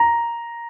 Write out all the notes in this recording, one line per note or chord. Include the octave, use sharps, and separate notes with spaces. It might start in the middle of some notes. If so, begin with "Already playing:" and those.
Already playing: A#5